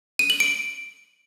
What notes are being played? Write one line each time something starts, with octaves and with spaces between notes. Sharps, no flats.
D#7
F#7
D7